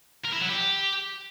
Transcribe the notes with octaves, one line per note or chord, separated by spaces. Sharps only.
A#4
E4
F#3
G4